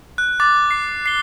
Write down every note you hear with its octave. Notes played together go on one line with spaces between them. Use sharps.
F#6
D6 A6
C7
C7 G7